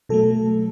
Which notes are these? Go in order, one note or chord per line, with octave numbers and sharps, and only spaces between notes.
B2 F#3 A3 A4